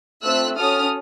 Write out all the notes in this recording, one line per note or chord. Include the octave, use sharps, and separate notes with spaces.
A3 C4 F4 E6 F#6
C#4 F#4 A4 D#6 F6